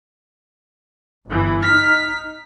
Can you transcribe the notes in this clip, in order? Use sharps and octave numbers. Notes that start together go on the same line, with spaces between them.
G1 E3
D#4 F6 B6